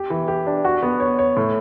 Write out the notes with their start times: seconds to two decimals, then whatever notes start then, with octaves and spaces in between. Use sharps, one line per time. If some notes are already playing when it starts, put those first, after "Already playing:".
Already playing: G4
0.10 E3
0.28 G4
0.47 D4
0.65 F#4
0.83 B3
1.00 C#5
1.19 C#5
1.37 A2